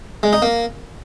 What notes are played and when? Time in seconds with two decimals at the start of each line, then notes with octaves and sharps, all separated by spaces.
0.23 G#3
0.33 D#4
0.42 A#3